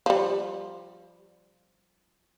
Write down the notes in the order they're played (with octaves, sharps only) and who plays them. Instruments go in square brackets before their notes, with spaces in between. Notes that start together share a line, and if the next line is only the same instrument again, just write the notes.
[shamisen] F3 G3